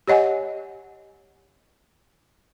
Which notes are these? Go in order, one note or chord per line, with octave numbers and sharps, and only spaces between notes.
G4 C#5 D#5 F#5 G#5